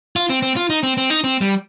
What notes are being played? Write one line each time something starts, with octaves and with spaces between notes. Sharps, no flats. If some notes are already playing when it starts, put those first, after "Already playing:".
F4
C4
C4
F4
D#4
C4
C4
D#4
C4
G3